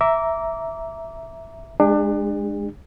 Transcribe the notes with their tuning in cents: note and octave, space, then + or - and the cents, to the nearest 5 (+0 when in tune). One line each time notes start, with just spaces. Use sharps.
E5 +0 A#5 +0 D6 -20
G#3 +0 D4 +30 G#4 -45